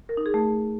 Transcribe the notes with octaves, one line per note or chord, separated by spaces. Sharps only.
A#4
D#4
G#4
A3